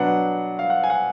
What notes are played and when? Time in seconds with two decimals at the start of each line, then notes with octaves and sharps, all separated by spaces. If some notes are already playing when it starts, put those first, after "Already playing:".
Already playing: B2 F#3 B3 D4 F#5
0.59 F5
0.70 F#5
0.84 G#5
0.90 F#5